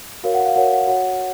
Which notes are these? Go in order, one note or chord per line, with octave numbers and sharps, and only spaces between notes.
F#4 A#4 C#5 F5
F#5
F5
F#4 A#4 C#5 F#5
F#5
F#4 C#5 F#5